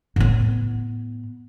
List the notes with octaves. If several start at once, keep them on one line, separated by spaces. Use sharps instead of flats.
A2 B3